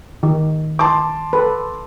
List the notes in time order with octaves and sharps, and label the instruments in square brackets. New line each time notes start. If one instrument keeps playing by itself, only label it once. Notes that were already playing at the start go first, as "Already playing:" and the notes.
[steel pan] D#3
[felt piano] A5 C6 D6
[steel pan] A4 B4